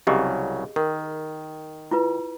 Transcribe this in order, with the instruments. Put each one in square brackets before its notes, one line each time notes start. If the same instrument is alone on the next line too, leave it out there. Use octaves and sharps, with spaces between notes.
[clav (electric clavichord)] C2 C#3 F#3 [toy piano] G4 G#4 D#5
[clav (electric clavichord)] D#3 [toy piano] A#4
[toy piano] E4 F4 B4